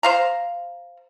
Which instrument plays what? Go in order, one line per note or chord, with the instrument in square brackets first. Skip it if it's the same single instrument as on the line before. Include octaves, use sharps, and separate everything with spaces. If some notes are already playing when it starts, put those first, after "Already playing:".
[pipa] C5 F5 A#5